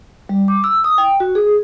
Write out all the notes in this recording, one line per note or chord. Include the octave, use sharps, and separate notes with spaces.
G3
D6
E6
D#6
G5
F#4
G#4